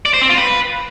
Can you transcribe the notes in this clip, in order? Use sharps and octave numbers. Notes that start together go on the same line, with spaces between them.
D5
C5
C4
F4
B4